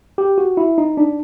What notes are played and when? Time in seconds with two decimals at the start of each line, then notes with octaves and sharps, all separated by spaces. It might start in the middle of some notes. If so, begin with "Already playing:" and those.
0.18 G4
0.38 F#4
0.57 E4
0.78 D#4
0.97 D4